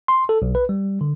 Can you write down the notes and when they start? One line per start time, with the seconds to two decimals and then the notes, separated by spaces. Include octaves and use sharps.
0.08 C6
0.29 A4
0.42 B1
0.55 B4
0.69 G3
1.01 D3